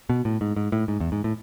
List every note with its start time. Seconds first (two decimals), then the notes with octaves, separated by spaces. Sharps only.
0.09 B2
0.25 A2
0.41 G#2
0.56 G#2
0.72 A2
0.88 G#2
1.00 E2
1.12 G#2
1.24 A2